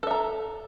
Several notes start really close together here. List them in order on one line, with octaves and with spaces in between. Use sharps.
A4 E5 A#5